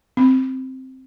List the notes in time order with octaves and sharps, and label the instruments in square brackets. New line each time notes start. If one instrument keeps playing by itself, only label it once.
[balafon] C4